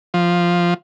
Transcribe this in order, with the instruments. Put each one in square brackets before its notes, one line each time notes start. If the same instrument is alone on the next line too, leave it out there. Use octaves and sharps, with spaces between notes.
[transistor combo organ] F3